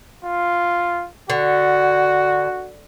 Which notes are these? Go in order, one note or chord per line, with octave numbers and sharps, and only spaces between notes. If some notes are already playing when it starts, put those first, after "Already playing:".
F4
D3 F#4